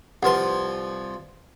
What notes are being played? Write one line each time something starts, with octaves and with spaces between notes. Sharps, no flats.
C2 F3 B4 F#5 C6